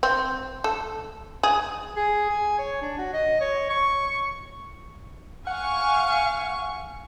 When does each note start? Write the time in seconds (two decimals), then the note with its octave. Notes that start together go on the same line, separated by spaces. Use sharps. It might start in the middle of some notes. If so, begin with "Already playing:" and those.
0.03 C4
0.64 A4
1.43 G#4
1.96 G#4
2.30 G#5
2.58 C#5
2.82 D4
2.98 F#4
3.13 D#5
3.41 C#5
3.70 C#6
5.47 F5 F#5 G#5 C#6